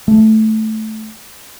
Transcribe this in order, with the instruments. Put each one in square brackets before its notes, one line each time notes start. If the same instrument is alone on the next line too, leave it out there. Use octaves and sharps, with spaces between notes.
[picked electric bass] A3